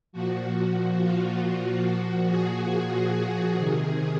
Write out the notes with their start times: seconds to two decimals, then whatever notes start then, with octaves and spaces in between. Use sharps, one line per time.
0.13 A#2 F3 F#4
0.99 F4
1.84 A#2 F3 F#4
2.28 G#4
3.57 C3 D#3 G#4